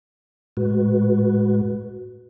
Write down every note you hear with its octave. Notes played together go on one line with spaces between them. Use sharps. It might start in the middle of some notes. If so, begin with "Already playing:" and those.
A2 G#3 F#4 B4